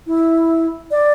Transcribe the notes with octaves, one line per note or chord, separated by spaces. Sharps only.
E4
D5